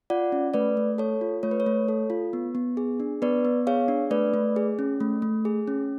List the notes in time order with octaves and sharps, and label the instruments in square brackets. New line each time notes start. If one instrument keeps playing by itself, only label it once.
[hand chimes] F4 D5 F#5
C#4
A3 B4 D5
A3
A4 C#5
F4
A3 C#5
B4
C#5
A3
A4
F4
B3
B3
G#4
D4
B3 B4 D5
B3
G#4 C#5 F5
D4
A3 B4 D5
A3
G#4
C#4
A3
A3
G#4
C#4